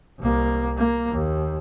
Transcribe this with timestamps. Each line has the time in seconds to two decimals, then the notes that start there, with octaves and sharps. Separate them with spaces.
0.20 C2 A#3
0.77 A#3
1.11 D#2